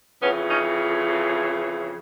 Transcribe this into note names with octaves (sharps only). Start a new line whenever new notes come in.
F2 C#3 E3 B3 C#4
C#4 D#4